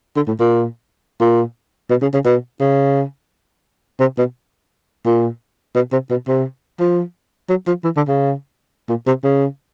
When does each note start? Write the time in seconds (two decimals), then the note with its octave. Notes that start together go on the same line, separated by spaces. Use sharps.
0.16 D3
0.27 A2
0.39 A#2
1.20 A#2
1.90 B2
2.02 C#3
2.14 C#3
2.25 B2
2.60 C#3
4.00 C3
4.18 B2
5.06 A#2
5.75 B2
5.92 C3
6.10 B2
6.28 C3
6.80 F3
7.49 F#3
7.67 F3
7.84 E3
7.97 D3
8.08 C#3
8.89 A#2
9.07 C3
9.24 C#3